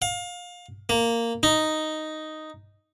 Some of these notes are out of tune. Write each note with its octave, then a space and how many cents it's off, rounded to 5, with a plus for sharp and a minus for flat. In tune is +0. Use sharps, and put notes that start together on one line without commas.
F5 +25
A#3 -10
D#4 +0